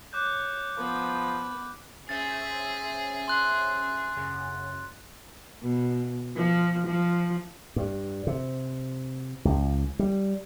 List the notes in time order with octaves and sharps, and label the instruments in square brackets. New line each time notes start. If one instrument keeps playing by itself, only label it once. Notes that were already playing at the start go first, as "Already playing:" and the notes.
[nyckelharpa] C#5 [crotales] D6 F#6 G6
[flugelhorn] F3 [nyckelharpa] B3 B5
[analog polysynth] C#4 C5 E5 [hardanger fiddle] G#4 [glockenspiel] A6
[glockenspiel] C6 F#6
[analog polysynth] F#2 C#3
[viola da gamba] B2
F3
F3
[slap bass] G2
C3
C#2
G3